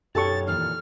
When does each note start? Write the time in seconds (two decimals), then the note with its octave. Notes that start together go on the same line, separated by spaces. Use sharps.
0.15 F#2 B2 D#4 G4 A4 C#5 C#6 A6
0.48 A#2 D#3 E3 F6